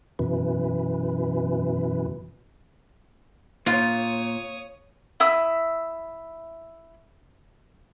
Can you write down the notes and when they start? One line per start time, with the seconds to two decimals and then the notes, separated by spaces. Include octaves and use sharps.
0.19 F#2 B2 E3
3.66 A#2 F4 C#5 D#6
5.20 E4 E5 D#6